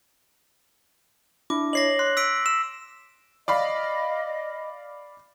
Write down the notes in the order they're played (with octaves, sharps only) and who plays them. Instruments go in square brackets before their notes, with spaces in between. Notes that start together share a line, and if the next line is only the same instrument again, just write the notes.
[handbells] D4 E4 [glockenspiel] D6
[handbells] C#5 D#5 [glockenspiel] A#6 C7 F#7
[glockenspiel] C6 [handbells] F#6
[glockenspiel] E6 B6 D7
[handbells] E6 [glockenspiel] E7
[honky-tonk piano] D5 F5 B5 [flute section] D#5